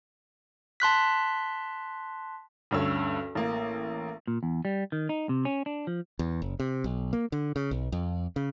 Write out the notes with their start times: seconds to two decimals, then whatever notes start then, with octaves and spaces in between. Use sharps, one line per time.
0.80 A5 C6 F#6 B6
2.71 D2 G2 C#4 E6
3.35 A1 A#3
4.28 A#2
4.43 E2
4.65 G3
4.92 D#3
5.09 D#4
5.29 C3
5.45 C#4
5.66 D4
5.87 F3
6.19 E2
6.42 F#1
6.60 C3
6.84 B1
7.13 A#3
7.32 D3
7.56 C#3
7.71 B1
7.92 F2
8.36 C#3